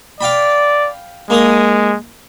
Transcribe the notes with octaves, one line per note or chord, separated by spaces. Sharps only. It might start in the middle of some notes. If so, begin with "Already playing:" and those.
D5 F5 G5 B5
G#3 A#3 D#4 D#6